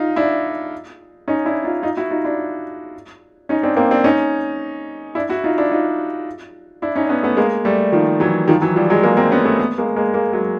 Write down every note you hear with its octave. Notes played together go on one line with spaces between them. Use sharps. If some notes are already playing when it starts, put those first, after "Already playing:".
Already playing: D#4 F4
D4 E4
C#4 D#4
D4 E4
D#4 F4
D#4 F4
E4 F#4
D#4 F4
D4 E4
C#4 D#4
C4 D4
A#3 C4
C4 D4
C#4 D#4
D4 E4
E4 F#4
D#4 F4
D4 E4
D#4 F4
D4 E4
C#4 D#4
D4
B3 C#4
A3 B3
G#3 A#3
G3 A3
D#3 F3
E3 F#3
D#3 F3
E3 F#3
F3 G3
F#3 G#3
G#3 A#3
A#3 C4
B3 C#4
A3 B3
A3 B3
G#3 A#3
G#3 A#3
G#3 A#3
F#3 G#3